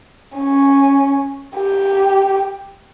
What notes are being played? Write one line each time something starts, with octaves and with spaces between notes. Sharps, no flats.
C#4
G4